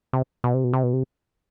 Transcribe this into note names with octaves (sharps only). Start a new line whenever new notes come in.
C3
B2
C3
B2
C3
B2
C3